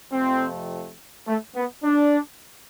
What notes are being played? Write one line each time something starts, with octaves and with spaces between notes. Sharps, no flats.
F2 C3 F3 A3 C4
A3
B3
D4